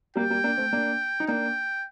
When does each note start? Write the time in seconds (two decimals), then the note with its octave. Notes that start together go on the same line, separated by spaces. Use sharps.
0.16 G3 A#3 G5
0.30 G3 A#3
0.44 A#3 D4
0.58 A3 C4
0.73 A#3 D4
1.20 D#4
1.28 A#3 D4 G5